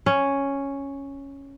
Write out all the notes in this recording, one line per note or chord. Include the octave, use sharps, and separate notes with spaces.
C#4